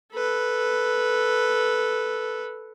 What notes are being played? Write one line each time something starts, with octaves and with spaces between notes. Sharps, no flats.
A4 B4